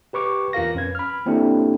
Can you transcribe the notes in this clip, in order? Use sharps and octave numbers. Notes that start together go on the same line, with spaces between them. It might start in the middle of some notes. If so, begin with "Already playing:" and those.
G4 B4 C#6 D6
E2 F4 A#4 F5 A#6
F2 C#4 B4 G#6
B5 F6
A#3 C4 D4 E4 G4 A4